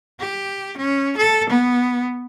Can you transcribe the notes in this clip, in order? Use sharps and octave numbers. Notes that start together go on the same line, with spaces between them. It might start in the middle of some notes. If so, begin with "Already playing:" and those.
G4
C#4
A4
B3